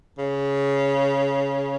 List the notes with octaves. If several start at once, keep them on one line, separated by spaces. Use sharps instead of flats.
C#3